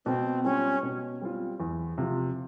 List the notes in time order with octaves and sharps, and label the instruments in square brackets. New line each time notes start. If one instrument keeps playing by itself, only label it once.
[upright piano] B2 [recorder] C4
[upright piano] G3 C4 F4 [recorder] C#4
[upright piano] B2
G3 C4 F4
E2
C3 F3